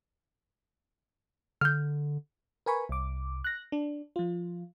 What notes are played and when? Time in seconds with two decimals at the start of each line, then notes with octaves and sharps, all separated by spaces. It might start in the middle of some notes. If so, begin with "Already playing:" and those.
1.61 D3 F6 G6
2.66 A#4 B4 G#5 B5 C#6
2.89 C2 D6
3.44 F#6 A#6
3.72 D4
4.16 F3 F4